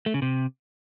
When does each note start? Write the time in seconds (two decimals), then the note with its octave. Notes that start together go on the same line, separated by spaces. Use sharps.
0.06 A3
0.14 C#3
0.22 C3